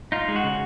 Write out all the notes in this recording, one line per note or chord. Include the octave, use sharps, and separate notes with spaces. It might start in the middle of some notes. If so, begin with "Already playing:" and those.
D#4 F4
G#3
F#4
C#3